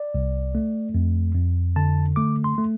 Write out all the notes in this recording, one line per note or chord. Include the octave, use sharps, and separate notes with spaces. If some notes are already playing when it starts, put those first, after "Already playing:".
Already playing: D5
C2
A3
F2
F2
D3 A5
A3 D6
C6
A3